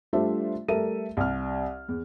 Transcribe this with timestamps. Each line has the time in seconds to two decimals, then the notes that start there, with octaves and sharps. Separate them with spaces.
0.13 G3 A3 D4 F4 C5 E5
0.68 G3 A3 A4 A#4 E5 D#7
1.17 C2 F6
1.88 E2